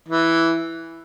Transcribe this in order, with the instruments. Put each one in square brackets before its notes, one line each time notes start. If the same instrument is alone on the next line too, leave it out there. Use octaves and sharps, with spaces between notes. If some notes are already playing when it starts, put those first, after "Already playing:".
[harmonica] E3